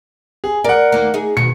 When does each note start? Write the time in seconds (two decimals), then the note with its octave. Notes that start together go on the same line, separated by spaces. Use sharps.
0.44 G#4
0.64 A#4 D5 F#5
0.92 D#2 A#3
1.14 D#4 G#4
1.37 B2 D#3 F#4 C#7